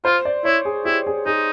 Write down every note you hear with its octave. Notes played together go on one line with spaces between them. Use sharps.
F4 C5
D5
E4 C#5
G#4
E4 G4
G#4
D#4 G#4